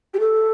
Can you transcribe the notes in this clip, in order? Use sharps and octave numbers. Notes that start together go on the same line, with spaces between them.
G4
A4